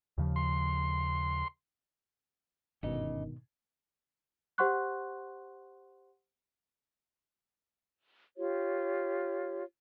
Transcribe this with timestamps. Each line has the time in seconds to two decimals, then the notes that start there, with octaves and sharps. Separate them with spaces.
0.18 D#2 C#3 F3
0.36 C6
2.83 G1 G#2 B2 D#3 C#4 D#5
4.58 G4 C5 F#5 C6 C#6 F#6
8.37 F4 G4 C#5